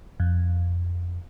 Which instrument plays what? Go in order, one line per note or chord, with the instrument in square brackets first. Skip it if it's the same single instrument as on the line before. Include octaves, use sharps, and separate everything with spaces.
[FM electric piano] F2